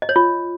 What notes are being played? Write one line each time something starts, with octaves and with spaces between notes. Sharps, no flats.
D#5
C#5
F4